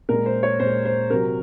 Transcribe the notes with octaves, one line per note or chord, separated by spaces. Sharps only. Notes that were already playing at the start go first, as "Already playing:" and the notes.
A#2 G#3 A#4
C5
C#5
A#2 G#3 C5
C5
C3 F#3 A#4